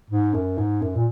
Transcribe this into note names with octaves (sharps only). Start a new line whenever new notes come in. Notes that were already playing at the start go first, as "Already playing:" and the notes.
G#2
F#2
G#2
F#2
A#2